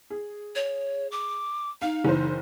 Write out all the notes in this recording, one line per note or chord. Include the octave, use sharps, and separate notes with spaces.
G#4
C#5
D6
D#4 F5
F#1 E3 C5